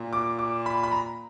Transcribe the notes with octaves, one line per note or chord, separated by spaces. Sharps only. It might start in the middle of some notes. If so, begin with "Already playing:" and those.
Already playing: A#2
D6
D6
B5
B5
A#5